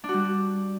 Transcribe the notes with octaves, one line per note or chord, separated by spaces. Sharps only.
D4
F#4
G3